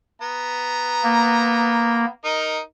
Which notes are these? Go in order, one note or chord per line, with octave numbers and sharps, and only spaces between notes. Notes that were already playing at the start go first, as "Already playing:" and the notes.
B3 A#5
A#3
D#4 A#4 D#5